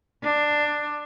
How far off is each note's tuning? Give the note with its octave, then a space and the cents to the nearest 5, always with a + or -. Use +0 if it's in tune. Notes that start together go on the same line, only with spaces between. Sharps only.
D4 +10